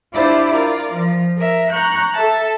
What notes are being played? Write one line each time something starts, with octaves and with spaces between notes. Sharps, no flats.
D4 E4 F4 G4 C5 D5
F4 A#4 D5
F3
A#4 E5
A#5 C#6 F#6 G6
A4 E5 A5